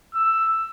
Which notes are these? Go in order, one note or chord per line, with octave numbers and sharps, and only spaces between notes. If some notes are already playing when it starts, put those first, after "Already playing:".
E6